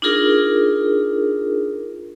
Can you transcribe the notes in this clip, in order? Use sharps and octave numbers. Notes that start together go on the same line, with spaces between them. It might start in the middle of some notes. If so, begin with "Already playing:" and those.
D4 D#4 F4 G#4 A#4